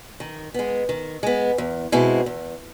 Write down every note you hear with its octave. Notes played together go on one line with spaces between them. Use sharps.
D#3
G#3 B3
D#3
G#3 B3
E2
B2 G#3 C4 E4
E2